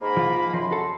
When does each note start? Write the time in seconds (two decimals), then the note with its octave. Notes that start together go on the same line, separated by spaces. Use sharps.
0.01 G#2 A#3 B5
0.17 F3 F4
0.54 F#2 F3 C6
0.71 F#4 A4